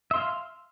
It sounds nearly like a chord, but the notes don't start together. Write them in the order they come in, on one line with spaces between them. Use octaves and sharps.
E5 C6 F5